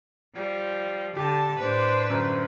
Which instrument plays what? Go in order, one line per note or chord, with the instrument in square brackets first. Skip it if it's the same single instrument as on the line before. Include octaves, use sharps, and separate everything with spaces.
[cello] F3 [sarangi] G3
[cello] D3 [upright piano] G4 [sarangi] A5
[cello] A2 D4 [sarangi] B4 [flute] C5
[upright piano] G1 F#2 [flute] C5